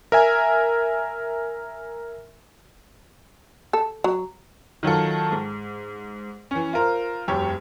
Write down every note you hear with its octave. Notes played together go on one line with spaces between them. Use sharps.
A#4 E5 G#5
A4
F#3
D#3 F#3 F4 A4
G#2
E3 C#4
F4 A#4 C5
E1 F#2 G4 C#5